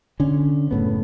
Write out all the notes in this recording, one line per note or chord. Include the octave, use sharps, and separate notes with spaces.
D3 C#4
F#1 A2 B3